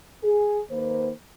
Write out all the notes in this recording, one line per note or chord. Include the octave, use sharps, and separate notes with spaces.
G#4
D#2 D#3 A#3 B4 C5